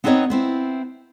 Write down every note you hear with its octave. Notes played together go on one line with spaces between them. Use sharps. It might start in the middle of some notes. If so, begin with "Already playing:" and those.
B3 C4 D#4 B4 C#5 D#5
B3 C4 E4